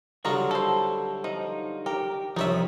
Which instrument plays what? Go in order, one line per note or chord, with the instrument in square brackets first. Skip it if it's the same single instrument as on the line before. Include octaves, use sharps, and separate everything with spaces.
[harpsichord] D3 F#3 G3 [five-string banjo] F4 D#5 A#5 [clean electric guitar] F#4
[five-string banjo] E4 C5 [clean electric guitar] A4
[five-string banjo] F3 [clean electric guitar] D#4
[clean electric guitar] G4 [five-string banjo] A#4
[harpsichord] C2 D5 D#6 [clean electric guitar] F3 [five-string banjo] D#4 C#5 E5